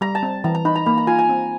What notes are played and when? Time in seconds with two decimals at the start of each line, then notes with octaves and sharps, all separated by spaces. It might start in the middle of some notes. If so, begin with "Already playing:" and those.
0.01 G3 A#5
0.15 A5
0.23 C4
0.44 E3 A#5
0.55 A#5
0.65 D#4 B5
0.75 A#5
0.86 A#3 B5
0.98 A#5
1.07 F4 G#5
1.19 G#5
1.29 C4